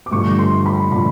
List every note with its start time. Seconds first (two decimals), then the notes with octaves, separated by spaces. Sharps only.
0.06 D6
0.11 G2 D3 F3 A3 C#6
0.39 C6
0.66 B5
0.92 D3 F3 A3 B5